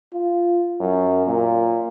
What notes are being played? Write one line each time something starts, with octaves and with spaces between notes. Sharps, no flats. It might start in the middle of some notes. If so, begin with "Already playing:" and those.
F4
F#2
A#2